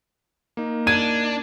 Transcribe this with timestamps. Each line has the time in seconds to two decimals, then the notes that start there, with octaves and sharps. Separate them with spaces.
0.57 A#3 D#4
0.87 D4 G#6 D#7